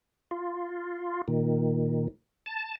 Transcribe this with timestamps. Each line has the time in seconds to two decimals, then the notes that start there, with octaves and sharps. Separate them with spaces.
0.31 F4
1.28 A#2 D#3
2.46 A5